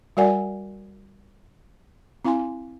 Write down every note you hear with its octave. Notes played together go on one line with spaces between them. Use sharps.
G3 F#4 A#4 D5 F#5 G#5
C4 E4 F5 G#5 C6